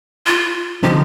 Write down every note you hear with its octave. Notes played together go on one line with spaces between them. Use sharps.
F4
D3 F3 C4 D#4 G4